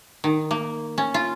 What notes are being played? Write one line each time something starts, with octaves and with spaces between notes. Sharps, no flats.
D#3
A#3
C#4
F4